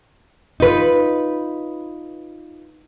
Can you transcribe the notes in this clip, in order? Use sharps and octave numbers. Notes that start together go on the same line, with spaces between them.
D#4 F4 B4